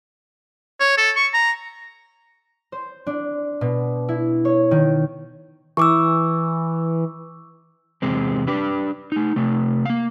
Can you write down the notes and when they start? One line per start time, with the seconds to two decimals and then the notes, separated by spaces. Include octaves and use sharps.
0.80 C#5
0.98 A4
1.16 C#6
1.34 A#5
2.72 C5
3.07 D4
3.61 B2
4.09 E4
4.45 C#5
4.71 D#3
5.77 E3 C#6 D6 E6
8.02 E2 C3 G#3 C4
8.47 D4 G4 B4
9.12 A3 D#4
9.36 C3 A3
9.85 A#3 F5